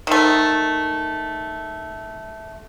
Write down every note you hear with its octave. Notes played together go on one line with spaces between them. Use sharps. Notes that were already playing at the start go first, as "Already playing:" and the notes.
D#3 A3